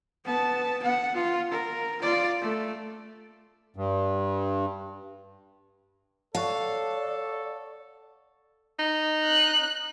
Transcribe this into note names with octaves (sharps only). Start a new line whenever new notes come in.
B3 A5
B3 F#5
F4
A#4
F4 D5
A3
G2
A4 C#5 D5 F5 F#5 A5
D#4
F#6